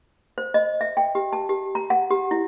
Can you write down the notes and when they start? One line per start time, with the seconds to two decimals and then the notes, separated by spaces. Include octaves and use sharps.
0.38 C5
0.54 D#5
0.81 E5
0.97 G5
1.15 G4
1.33 A5
1.49 G4
1.75 A#5
1.90 F#5
2.10 G4
2.31 E4